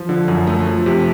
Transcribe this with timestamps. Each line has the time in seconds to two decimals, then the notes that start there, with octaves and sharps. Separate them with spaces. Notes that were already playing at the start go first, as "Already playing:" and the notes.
Already playing: F3
0.09 D3
0.28 F#2
0.47 A3
0.67 F3
0.86 C3